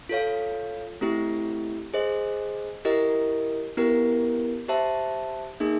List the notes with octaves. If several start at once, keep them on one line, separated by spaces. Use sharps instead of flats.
F4 A4 C#5 F5
A3 C4 E4 G4
G#4 C5 D#5
E4 G4 A#4 D#5
B3 E4 G4 A#4
G4 C5 E5 A5
A#3 D#4 G#4